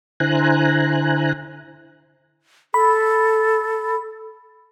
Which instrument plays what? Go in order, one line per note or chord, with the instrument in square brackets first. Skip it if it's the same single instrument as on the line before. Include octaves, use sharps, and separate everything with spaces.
[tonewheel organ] D3 E4 C5 G#5 A#5 F#6
[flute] A4 [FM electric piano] B5